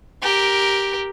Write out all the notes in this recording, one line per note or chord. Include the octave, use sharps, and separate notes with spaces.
G4 A#4